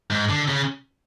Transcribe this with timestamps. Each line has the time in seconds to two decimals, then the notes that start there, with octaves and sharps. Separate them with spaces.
0.10 G#2
0.29 D3
0.48 C#3